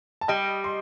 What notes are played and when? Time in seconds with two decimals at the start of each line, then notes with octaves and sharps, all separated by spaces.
0.21 A5
0.28 G3 D#5 G5
0.64 C6